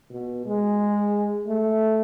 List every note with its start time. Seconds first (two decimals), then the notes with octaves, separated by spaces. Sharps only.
0.12 B2
0.46 G#3
1.47 A3